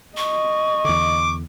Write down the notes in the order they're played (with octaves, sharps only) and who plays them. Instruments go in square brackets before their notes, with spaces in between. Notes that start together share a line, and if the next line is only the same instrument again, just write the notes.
[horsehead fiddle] D#5 [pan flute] C#6
[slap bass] E2 D3 [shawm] D6